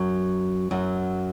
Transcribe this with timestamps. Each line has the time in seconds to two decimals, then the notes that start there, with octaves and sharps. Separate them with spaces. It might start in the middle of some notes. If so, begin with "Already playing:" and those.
Already playing: F#2 F#3
0.71 F#2 F#3